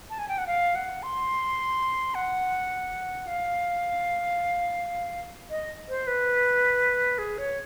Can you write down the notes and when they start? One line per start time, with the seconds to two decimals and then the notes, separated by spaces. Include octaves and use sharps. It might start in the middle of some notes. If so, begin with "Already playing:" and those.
0.10 A5
0.19 G#5
0.28 G5
0.38 F#5
0.47 F5
0.75 F#5
1.03 C6
2.15 F#5
3.27 F5
5.50 D#5
5.89 C5
6.07 B4
7.18 G#4
7.38 C#5